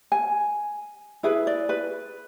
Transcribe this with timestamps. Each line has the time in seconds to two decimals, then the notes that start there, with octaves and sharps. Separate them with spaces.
0.12 G#5
1.23 E4 G#4 B4 E5
1.47 D5
1.69 B4